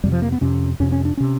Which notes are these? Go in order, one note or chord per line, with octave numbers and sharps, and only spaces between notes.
F2 C3 G3
F3
A#3
B3
F2 C3 C#4
F2 C3 C#4
C#4
D4
C3 C#4